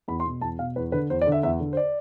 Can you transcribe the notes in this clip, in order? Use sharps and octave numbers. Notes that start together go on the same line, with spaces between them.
E2 B5
C6
B2
E2 A5
B2 F5
E2 B4
D3 B4
E2 C5
D5
D3
E5
E2 E5
D3
C5
D5